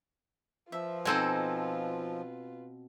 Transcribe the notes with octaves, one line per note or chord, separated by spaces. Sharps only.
F3 F4 B4 E5
B2 C4 D#4 A4 G#5